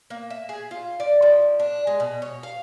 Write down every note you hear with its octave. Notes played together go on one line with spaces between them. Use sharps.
A#3
E5
G#4
F4
D5
F3
D4
G#3
B2
C#5
F5